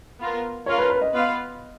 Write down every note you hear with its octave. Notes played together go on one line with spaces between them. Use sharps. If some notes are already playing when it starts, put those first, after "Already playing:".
B3 F4 A#4
C#4 F4 A#4 C#5 F5
B4
B4
D#5
B3 F4 B4 F5